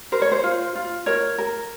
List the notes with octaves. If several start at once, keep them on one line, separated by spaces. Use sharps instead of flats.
A#4 C5
C#5
C5
F4
F4
A#4 C#5
A#4